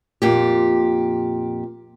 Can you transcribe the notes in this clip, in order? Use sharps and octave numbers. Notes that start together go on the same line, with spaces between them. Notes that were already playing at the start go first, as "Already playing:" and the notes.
F2 A#2 G4